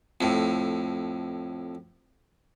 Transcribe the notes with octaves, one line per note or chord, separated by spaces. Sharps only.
F2 A2